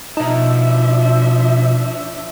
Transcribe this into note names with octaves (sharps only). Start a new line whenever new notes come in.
B2 F3 D4 D#4 E5 A5